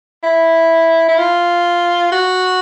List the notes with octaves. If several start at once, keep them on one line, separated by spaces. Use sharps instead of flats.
E4
E4
F4
F#4